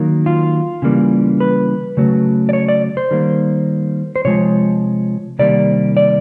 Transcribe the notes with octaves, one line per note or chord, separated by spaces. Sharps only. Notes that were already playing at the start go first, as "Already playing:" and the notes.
Already playing: D#3 F#3 A#3
F4
C#3 E3 G3 A#3
B4
C#3 F#3 A3
D5
C#5
D5
C5
D#3 G3 A#3
C5
C3 F3 G#3 C#5
C3 D#3 G3 A#3 D5
D5